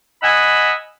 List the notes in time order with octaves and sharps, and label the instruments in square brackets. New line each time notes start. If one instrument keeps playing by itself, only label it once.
[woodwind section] D#5 F#5 G#5 B5 E6